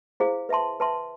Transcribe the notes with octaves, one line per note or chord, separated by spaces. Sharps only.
E4 G#4 C5 F5
B4 E5 A5 C6
B4 E5 A5 C6